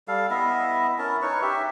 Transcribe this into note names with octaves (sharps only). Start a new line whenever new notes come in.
G3 A4 F5
B3 E4 D#5 E5
C#4 E4 A#4 A5
D#4 B4 C#5 C#6
G4 E5